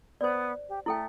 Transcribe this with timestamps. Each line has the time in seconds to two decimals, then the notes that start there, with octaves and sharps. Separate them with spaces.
0.21 B3 C5 D5
0.69 G4
0.86 A3 E4 A4 G5